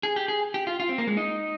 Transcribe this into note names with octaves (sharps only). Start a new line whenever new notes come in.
G#4
G4
G#4
G4
F4
F4
C4
A#3
G#3
D#4